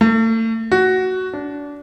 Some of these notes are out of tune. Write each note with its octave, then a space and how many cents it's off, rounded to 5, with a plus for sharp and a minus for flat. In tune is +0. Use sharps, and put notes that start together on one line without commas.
A3 +40
F#4 +10
D4 -25